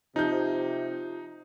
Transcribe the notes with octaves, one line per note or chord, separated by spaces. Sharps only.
C3 F3 D#4 G6